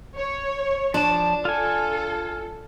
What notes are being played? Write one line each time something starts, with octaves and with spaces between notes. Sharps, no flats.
C#5
F3 D4 A5
F4 A4 G#5